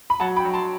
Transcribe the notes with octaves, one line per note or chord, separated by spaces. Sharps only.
B5
F#3 F#5 A5
G5 B5
F#3
A5 C6